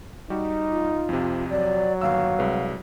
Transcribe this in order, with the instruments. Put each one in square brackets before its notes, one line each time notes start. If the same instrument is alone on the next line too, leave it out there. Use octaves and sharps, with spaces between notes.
[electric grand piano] G3 F#4 G4 [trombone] D#4
[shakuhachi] F4
[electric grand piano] F2 C3
[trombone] F#3 [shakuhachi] D5
[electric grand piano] G1 D#2 E6 [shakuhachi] F5
[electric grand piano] C2 G#3 B4